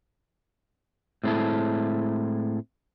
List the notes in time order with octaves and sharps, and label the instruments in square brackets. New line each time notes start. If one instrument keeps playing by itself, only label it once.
[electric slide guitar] A2 G#3 C4 D4 E4 A4